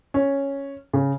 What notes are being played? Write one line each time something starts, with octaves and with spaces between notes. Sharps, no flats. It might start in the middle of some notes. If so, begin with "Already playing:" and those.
C#4
C#3